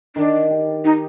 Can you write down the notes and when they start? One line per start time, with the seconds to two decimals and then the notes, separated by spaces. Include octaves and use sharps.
0.16 D#3 D4
0.51 G4
0.84 D#4 G4